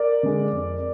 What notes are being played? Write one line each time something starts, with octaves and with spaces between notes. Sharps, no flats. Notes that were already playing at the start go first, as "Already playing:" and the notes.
Already playing: A#4 D5
D3 G#3
F2